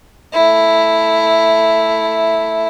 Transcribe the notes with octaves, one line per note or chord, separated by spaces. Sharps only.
A3 E4